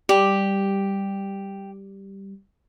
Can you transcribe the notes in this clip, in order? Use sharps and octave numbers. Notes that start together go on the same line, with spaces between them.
G3 G4